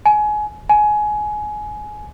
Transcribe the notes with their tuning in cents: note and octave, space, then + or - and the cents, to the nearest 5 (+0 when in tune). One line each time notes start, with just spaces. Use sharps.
G#5 +25
G#5 +20